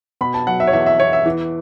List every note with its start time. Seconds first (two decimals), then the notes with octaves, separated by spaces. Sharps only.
0.21 B2 B5
0.34 A5
0.47 F#3 F#5
0.60 E5
0.67 C#5
0.73 E2 E5
0.86 E5
1.00 E2 C#5
1.13 E5
1.26 E3